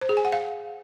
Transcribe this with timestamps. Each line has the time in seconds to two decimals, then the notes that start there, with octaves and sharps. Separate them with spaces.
0.01 C5
0.09 G#4
0.17 G#5
0.25 F#5
0.32 F5